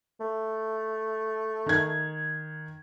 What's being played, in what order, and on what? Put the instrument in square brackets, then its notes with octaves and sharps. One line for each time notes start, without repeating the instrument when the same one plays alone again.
[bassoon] A3
[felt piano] D#3 G#6